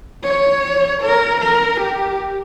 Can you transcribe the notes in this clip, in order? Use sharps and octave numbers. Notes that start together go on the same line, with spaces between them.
C#5
A#4
A#4
G4